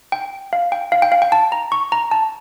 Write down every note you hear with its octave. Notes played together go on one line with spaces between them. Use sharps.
G5
F5
G5
F5
G5
F5
G5
A5
A#5
C#6
A#5
A5